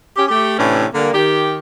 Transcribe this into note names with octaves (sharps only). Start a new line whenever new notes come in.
C#4 G4
A3 G4
A2 C3 E3 C#4 D4
D3 G3 A#3
D#3 G4